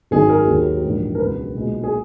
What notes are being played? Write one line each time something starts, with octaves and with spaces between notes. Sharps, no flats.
G#1 F#2 D#3 G#4
A#4
D#2 D#3 F#3
A#1 G#2 E3
A#4
C#2 B2 F#3 B4
B1 A#2 G#3
G#4